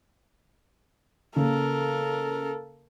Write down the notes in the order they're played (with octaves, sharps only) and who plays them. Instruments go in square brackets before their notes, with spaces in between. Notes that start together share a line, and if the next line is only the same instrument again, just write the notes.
[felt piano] C#3 A#3 [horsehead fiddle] A4 A#4